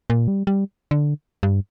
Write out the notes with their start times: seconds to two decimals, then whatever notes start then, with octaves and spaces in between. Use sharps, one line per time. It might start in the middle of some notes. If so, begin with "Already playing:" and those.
0.10 A#2
0.28 G3
0.47 G3
0.91 D3
1.43 G2